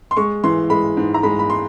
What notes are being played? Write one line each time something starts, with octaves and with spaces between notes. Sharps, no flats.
C6
G#3 C#6
E3 C6
G#3 B5
G#2
A#5
G#3 B5
B5
C6